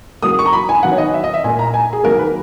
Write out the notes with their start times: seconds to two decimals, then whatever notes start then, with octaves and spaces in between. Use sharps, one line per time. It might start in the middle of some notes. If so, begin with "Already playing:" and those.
0.23 C#3 F#3 A#3 D#6
0.39 C#6
0.46 A#5
0.53 B5
0.69 G#5
0.83 D#3 F#3 B3 F#5
0.92 C#5
0.98 D#5
1.14 E5
1.24 D#5
1.34 E5
1.44 A#2 G#5
1.47 A#3
1.59 A#5
1.74 G#5
1.93 G#4
2.03 D#3 F#3 A#3 A#4
2.19 B4